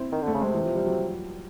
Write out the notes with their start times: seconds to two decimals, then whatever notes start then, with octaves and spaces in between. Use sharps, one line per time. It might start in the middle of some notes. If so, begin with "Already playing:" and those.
Already playing: C4 E4
0.12 D#3
0.22 D3
0.27 A3
0.34 C#3
0.41 C3 G#3
0.54 E3
0.65 F3
0.76 G3
0.87 F#3